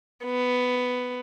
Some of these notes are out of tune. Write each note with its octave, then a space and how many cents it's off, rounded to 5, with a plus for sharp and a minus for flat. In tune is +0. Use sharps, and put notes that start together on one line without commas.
B3 +10